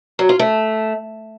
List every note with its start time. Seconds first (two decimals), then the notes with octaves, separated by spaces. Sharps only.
0.19 F#3
0.29 F4
0.39 A3